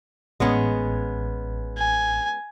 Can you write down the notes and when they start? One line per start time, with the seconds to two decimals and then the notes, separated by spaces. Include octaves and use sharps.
0.40 A1 G#3 B3 C#4
1.77 G#5